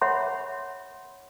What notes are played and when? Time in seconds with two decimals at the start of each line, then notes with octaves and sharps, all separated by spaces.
0.01 C#5 E5 F#5 B5 C6